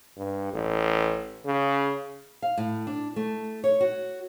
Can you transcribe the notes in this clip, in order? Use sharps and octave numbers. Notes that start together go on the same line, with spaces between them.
G2
A1
C#3
F5
A2
D4
A3
C#5
F#4